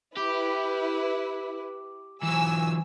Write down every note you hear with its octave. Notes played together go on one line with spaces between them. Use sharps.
E4 G4 B4
E3 F#3 G#5 E6